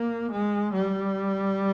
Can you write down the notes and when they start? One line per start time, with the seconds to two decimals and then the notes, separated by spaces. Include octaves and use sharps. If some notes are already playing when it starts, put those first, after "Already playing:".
Already playing: A#3
0.31 G#3
0.73 G3